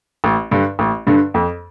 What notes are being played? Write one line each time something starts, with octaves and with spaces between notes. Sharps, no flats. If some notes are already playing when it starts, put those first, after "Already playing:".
A1
G2 D3
A1
G2 D3
F2